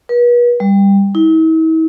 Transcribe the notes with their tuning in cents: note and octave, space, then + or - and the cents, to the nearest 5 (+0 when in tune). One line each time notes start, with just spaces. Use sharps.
B4 -40
G3 +15
E4 -45